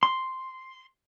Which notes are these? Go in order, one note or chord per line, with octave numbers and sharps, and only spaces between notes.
C6